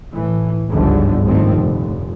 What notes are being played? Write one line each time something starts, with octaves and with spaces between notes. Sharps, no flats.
A2 E3
G1 C#2 G#2 D3 F3
G#1 D2 A#2 D#3 F3 C4
F1